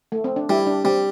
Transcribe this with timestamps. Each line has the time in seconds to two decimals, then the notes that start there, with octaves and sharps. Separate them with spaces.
0.12 A3
0.24 C4
0.36 D4
0.49 G3 E4
0.67 D4
0.84 G3 C4